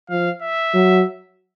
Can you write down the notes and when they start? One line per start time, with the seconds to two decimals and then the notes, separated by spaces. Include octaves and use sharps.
0.10 F3 F5
0.42 E5
0.74 F#3